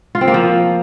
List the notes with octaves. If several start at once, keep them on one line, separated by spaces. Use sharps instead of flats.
F4
C4
A#3
F3